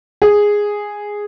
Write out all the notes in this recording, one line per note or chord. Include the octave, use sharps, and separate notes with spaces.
G#4